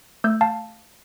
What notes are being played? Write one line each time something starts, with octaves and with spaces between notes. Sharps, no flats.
A3 E6 G6
F5 A5